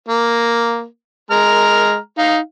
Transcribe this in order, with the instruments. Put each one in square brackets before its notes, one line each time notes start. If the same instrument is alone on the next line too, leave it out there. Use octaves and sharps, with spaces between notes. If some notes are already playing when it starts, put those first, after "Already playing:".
[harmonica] A#3
G#3 A#5 F6
D#4 F5